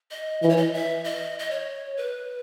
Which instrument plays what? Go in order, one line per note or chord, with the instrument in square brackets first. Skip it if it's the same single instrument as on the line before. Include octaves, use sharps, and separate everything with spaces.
[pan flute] D#5
[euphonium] E3 [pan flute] D#5
[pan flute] C#5
D#5
E5
D#5
D#5
C#5
B4